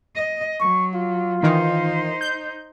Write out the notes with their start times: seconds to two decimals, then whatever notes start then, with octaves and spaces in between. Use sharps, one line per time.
0.15 D#5
0.60 F#3 C#6
0.95 F4
1.43 D#3 E3 D#4 C5
2.21 G6